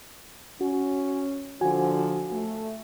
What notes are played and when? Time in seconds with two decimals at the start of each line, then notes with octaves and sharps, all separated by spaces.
0.61 C#4 F#4
1.61 D3 F3 F#4 G#5
2.32 A3